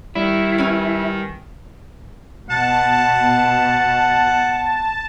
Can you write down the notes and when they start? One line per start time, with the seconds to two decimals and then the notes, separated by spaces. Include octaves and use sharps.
0.15 D#3 G3 E4
0.58 C#4 B4 G#5
2.50 B2 F#5 A5